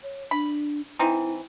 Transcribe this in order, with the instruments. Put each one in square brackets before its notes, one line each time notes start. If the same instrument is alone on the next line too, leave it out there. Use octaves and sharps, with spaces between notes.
[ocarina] C#5
[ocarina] D4 [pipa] B5
[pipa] E3 C4 D#4 [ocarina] E4